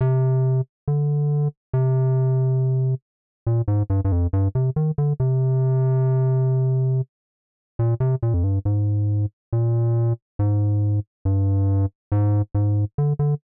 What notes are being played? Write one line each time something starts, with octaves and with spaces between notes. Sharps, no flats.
C3
D3
C3
A#2
G#2
G2
G2
F2
G2
C3
D#3
D3
C3
A#2
C3
A#2
F2
G2
G#2
A#2
G#2
G2
G#2
G#2
D3
D3